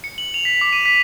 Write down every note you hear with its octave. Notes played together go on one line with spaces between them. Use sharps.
C#7
F#7
F7
B6
D6
D#7
B6